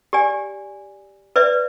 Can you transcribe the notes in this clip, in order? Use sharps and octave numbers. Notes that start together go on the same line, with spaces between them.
G4 D5 G#5
B4 D5 E5